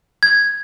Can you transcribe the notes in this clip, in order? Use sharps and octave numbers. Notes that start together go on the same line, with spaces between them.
G#6